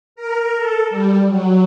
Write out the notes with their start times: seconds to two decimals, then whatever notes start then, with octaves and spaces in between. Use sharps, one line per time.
0.16 A#4
0.57 A4
0.90 G3
1.27 F#3